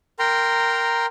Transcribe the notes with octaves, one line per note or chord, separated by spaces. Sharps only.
A#4 G5 A#5 C6